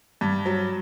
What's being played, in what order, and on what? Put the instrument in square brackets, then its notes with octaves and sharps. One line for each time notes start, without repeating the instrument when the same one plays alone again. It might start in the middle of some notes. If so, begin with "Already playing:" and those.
[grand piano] G2
F#3